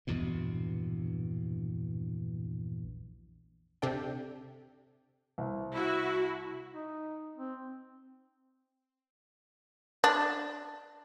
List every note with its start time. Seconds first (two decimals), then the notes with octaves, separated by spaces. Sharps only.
0.07 A#1 E2 G2 B2
3.82 C3 D4 A4 D5 G5
5.38 C2
5.72 E4 F#4
6.73 D#4
7.37 C4
10.04 D4